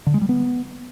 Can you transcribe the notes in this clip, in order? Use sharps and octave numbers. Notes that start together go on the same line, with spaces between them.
D3
G#3
G3
B3